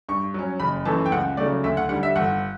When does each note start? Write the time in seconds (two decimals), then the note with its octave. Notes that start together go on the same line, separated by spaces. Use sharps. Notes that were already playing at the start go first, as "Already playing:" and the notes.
0.09 G2 C#6
0.34 F#3 C#4
0.60 F#1 B5
0.85 F#2 E3 A3 A5
1.06 G5
1.12 C#2 F#5
1.37 C#3 F#3 A3 D5
1.64 D2 E5
1.77 F#5
1.89 D3 G3 F#5
2.03 E5
2.16 G1 F#5